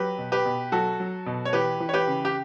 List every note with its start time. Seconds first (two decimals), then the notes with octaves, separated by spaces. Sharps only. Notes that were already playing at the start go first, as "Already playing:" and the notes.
Already playing: F#3 G4 B4
0.18 B2
0.32 G4 B4
0.45 B2
0.72 F#3 F#4 A4
1.00 F#3
1.26 B2
1.45 C#5
1.53 E3 G4 B4
1.80 E3
1.89 C#5
1.94 G4 B4
2.07 C#3
2.25 G4